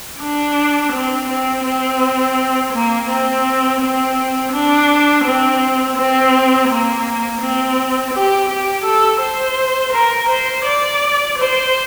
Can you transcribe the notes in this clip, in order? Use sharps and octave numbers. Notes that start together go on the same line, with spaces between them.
D4
C4
C4
C4
A#3
C4
C4
D4
C4
C4
A#3
C4
G4
G4
A4
C5
A#4
C5
D5
C5